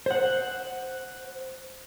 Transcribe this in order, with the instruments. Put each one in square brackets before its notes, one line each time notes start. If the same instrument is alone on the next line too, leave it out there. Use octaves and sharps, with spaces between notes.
[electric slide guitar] C5 F#5